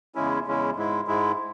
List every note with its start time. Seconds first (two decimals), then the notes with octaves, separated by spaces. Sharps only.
0.15 E2 C#3 G#3 C#4 E4
0.45 E2 C#3 G#3 C#4 E4
0.76 G#2 G#3 E4
1.07 G#2 G#3 E4